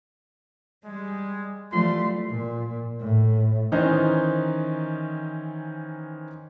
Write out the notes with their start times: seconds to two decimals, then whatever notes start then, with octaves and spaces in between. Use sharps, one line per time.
0.85 G3 G#3
1.72 E3 F3 G3 A3 C6
2.30 A#2
3.01 A2
3.72 D#3 E3 C#4 D#4 C5